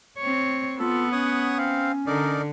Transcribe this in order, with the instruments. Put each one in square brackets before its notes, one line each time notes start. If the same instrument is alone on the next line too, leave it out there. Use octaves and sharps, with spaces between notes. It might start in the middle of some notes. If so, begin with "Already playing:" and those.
[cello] C4 C#5
[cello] B3 [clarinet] F4 [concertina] A4
[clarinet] C#4 [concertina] C#5 F#5 D#6
[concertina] C4 F5
[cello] D3 [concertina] D#4 A#4 D5